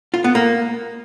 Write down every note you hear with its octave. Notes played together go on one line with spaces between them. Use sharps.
F4
B3
A#3